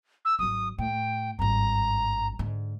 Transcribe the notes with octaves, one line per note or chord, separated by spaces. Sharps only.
E6
G#1 F#3 D#6
A2 G5
G#1 G2 A#5
G#2 D3